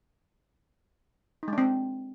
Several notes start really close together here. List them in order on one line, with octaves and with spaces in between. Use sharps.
D#4 G#3 D4 C4